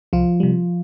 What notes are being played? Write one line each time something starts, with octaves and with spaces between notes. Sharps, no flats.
C2 F3 F4
C3 G3